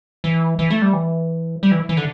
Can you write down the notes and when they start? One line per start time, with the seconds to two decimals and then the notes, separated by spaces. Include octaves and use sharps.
0.24 E3
0.59 E3
0.70 A3
0.82 G3
0.93 E3
1.63 G3
1.71 E3
1.89 E3
1.97 D3